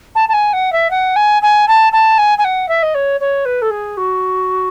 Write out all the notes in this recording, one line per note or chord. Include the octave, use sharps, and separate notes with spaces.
A5
A5
G#5
F#5
E5
F#5
G#5
G#5
A5
A5
G#5
G#5
F#5
E5
D#5
C#5
C#5
B4
A4
G#4
F#4